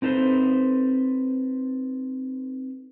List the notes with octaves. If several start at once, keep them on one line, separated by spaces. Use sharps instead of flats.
C4 D#4 A4 B4 C5